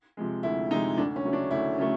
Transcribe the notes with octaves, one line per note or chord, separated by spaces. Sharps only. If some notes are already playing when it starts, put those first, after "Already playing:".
C3 F3 G#3
D2 E4
C3 F3 G#3 D#4
D2 D4
C#4
C#3 F#3 A3
D4
D2 E4
C#3 F#3 A3